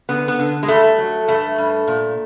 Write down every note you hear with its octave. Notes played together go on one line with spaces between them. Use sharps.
D3 B3
B3
D3
G#3
G2 A3
F#3
G2 A3
G2
A#2